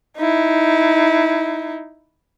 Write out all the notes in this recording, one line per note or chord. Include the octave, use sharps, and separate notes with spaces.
D#4 E4